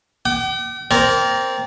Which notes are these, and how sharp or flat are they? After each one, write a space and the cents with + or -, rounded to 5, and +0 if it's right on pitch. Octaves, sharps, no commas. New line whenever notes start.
G5 -45 D6 +30
C4 +0 A#4 +0 D5 -30